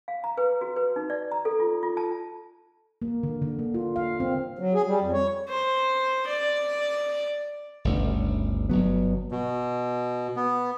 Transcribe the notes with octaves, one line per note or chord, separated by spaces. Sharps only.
F5
A#5
B4
F#4
B4
D#4
D5
A#5
A4
F4
F4
A5
A#3
D3
D3
A#3
F4
F5
C4
F#3
G#4
G3
F2
C#5
C5
D5
G1 D2 C#3
G1 F#3 B3
B2
B3